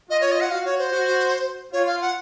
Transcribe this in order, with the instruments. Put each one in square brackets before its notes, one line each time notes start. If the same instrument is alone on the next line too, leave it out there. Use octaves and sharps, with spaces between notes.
[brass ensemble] F4 [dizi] D#5
[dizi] C#5
D#5
F#5
[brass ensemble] F#4 [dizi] F5
[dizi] C#5
C5
[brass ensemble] F#4
[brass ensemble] F4 [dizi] C#5
[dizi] F5
F#5